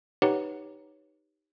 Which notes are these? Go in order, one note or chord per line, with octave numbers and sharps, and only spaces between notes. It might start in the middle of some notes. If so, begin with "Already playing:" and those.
D#4 G4 B4 C#5 F#5